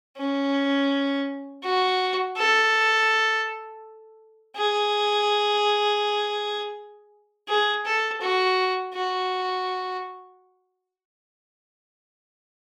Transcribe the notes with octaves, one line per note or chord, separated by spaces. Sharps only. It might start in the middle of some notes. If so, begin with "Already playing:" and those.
C#4
F#4
A4
G#4
G#4
A4
F#4
F#4